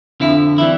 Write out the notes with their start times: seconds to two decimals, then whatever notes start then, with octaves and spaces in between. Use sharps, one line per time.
0.20 F2 D3 F3 E4
0.58 E3 G3 E4